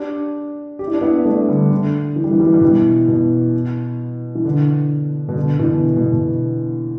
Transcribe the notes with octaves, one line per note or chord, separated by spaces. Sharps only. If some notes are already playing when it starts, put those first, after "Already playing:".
Already playing: D4 G4
G4
E4
D4
B3 E4
A3 D4
D3 G3
D3
E3
G3
E3
G3
E3
G3
B2 E3
B2
E3
D3
B2
D3
B2 E3
B2
B2